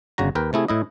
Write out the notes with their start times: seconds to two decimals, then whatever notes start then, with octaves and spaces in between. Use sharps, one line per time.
0.18 G1 C#3 F#4 A#5
0.35 D#2 A#4 B4 G5
0.53 C3 A3 E4 G#4
0.68 A2 E4 D#5